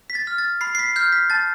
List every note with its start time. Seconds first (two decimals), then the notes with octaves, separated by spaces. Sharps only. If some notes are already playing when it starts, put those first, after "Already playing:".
0.10 B6
0.15 A6
0.27 F6
0.38 A6
0.61 B5 C7
0.75 C7
0.79 B6
0.96 F6 G6
1.12 B6
1.30 A5 A6